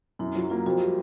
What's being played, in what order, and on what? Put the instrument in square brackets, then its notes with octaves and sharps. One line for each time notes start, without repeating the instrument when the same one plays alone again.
[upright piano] F#2 [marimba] E4
[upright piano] F#3 [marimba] F4
[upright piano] A#3 [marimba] F4
[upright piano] F2 [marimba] F#4
[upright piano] G3